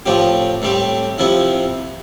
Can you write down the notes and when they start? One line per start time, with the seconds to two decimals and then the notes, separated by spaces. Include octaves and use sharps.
0.06 A2 F3 C4 G4
0.62 A2 G3 C4 G4
1.18 C3 F3 C4 E4